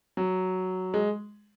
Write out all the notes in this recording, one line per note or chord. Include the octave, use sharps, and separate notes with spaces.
F#3
G#3